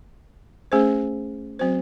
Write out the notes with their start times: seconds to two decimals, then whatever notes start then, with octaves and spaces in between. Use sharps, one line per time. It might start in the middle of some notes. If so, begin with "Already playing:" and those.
0.72 A3 C#4 G#4 C5
1.59 F#3 C4 F#4 C5